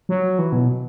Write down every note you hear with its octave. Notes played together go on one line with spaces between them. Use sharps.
F#3
E3
B2